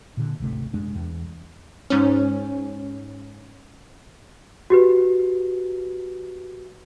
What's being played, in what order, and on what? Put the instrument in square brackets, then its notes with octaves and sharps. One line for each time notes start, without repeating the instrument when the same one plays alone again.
[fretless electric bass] A#2 D3
D1 G#1 C3 A3
F#2 G#3 D4
E2
[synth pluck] G#2 C#4
[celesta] F#4 G4 B4